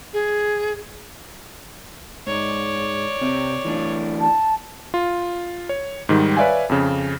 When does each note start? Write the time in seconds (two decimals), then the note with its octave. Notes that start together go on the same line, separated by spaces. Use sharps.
0.13 G#4
2.27 G#2 C#5 D5
3.21 C3 C4
3.65 E3 A3 D4
4.21 A5
4.94 F4
5.69 C#5
6.09 G#2 D#3 G3
6.37 B4 C#5 D5 E5 F5 G#5
6.69 F2 C#3